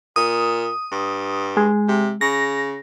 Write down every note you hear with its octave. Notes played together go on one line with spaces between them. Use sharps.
A#2 D#6
G2
G#3
C3
C#3 A#6